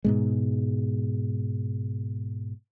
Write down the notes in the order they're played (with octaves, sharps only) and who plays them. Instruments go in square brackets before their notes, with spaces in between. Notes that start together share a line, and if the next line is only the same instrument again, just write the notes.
[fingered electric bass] G#2 B2 G#3